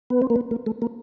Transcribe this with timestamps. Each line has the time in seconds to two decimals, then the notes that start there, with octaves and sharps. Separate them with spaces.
0.10 B3
0.22 C4
0.30 A#3
0.36 B3
0.51 A#3
0.66 A3
0.82 A#3